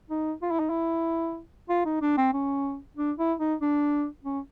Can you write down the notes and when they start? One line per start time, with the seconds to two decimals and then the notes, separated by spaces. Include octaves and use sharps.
0.10 D#4
0.42 F4
0.51 E4
0.59 D#4
0.70 E4
1.69 F4
1.85 D#4
2.01 D4
2.18 C4
2.33 C#4
2.97 D4
3.19 E4
3.40 D#4
3.61 D4
4.25 C#4